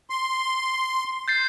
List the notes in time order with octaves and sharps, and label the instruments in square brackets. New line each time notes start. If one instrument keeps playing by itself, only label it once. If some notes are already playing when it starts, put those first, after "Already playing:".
[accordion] C6
[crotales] G6 A6 C7